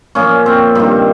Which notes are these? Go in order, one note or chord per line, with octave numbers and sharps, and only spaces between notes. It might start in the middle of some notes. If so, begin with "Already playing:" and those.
A#2 F3 C#4
C4
G2 D#3 C4